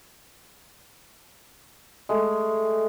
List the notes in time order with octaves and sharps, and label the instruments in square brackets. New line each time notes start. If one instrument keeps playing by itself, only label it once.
[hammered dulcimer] G#3 A3